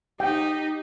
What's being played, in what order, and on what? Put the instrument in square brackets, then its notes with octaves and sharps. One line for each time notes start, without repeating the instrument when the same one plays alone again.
[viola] D#4 [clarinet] G4 [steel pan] G5